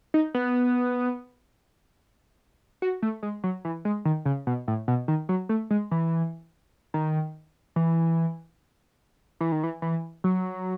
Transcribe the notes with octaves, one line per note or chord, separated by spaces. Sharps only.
D#4
B3
F#4
A3
G#3
F#3
E3
G#3
D#3
C#3
B2
A2
B2
D#3
F#3
A3
G#3
E3
D#3
E3
E3
D#3
E3
E3
F#3